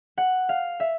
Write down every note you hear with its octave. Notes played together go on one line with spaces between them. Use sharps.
F#5
F5
E5